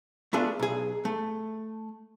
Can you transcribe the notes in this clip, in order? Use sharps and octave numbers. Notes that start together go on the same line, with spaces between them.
A3 B3 D4 F4 G#4 B4
B1 G#4
A3